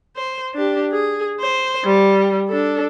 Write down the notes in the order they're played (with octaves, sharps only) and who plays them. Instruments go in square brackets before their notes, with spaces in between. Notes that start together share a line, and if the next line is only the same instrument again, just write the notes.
[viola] C5
D4 G4
G#4
C5
G3
D4 A4